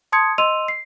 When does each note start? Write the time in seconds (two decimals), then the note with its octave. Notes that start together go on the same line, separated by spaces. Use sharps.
0.12 A5 C6 D#6 G#6 C#7
0.38 D#5 C6 E6 D#7 F7
0.68 C7